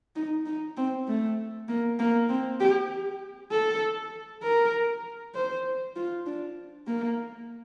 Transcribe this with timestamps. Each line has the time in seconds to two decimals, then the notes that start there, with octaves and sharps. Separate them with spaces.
0.16 D#4
0.46 D#4
0.77 C4
1.07 A3
1.68 A#3
1.99 A#3
2.29 C4
2.60 G4
3.51 A4
4.43 A#4
5.35 C5
5.96 F4
6.26 D4
6.87 A#3